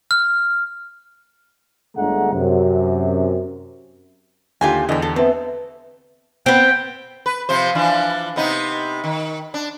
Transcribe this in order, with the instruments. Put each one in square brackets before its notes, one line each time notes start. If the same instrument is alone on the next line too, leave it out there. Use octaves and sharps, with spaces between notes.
[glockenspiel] F6
[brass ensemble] G1 D3 G#3 A3 F#5 A#5
F#2 C3
[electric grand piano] D#2 D3 G4 [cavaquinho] F4 G5 G#5
[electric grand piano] E2 D3 [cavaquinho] D#5 G5
[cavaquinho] A4
[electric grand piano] B3 C4 [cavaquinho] A4 [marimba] B4 E5
[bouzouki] B3 C4 [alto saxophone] G5
[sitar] B4
C3 F3 C5
E3 F3 D4
C3 B3 D#4
D#3
D4